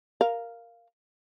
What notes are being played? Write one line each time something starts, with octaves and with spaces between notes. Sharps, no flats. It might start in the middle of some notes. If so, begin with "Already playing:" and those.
A#4 F5